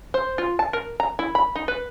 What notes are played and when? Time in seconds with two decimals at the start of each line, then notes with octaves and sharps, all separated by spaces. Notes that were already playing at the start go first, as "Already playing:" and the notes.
0.14 C5
0.38 F4
0.59 A5
0.73 A#4
1.00 A#5
1.19 E4
1.35 B5
1.55 D#4
1.68 B4